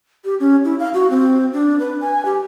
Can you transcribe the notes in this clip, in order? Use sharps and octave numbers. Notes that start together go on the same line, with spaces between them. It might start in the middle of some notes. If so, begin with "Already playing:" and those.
G4
C#4
E4
F5
F#4
C4
D4
B4
G#5
G4